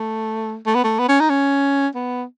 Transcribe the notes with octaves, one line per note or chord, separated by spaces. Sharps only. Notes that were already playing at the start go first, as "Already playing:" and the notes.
Already playing: A3
A3
B3
A3
B3
C#4
D#4
C#4
B3